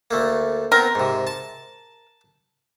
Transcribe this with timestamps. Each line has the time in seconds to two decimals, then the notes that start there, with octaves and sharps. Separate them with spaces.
0.11 D2 A3 A#3
0.72 B3 C4 A#4
0.95 G#2 C3
1.27 A5